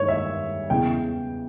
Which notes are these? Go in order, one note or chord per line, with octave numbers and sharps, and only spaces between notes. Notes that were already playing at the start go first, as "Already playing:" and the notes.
Already playing: G2 D#3 C#5
E5
E2 C#3 E3 G5